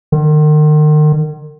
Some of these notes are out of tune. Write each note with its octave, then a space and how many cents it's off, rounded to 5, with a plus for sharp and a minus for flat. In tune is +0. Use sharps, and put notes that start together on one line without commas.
D#3 -40